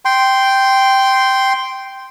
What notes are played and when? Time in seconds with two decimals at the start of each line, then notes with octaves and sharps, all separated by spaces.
0.05 G5 C6